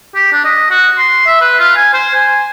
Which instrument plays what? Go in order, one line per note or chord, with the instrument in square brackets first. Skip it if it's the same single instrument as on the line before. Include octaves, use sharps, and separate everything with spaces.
[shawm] G4
D4
D#5
F#4
C6
E5
B4
F4
G#5
C5
G#5